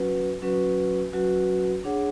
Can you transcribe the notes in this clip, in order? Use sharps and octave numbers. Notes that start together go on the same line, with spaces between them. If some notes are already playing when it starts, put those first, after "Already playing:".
Already playing: F#3 C#4 F#4 B4
F#3 C#4 F#4 B4
F#3 C#4 F#4 B4
D4 G#4 C#5 F#5